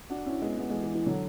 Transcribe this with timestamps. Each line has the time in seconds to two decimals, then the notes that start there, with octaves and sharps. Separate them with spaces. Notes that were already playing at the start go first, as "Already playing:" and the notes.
0.10 D4 F#4
0.26 C#4 E4
0.42 G#3 B3
0.58 G#3 B3
0.70 E3 G#3
0.83 E3
0.95 E3
1.06 D3 F#3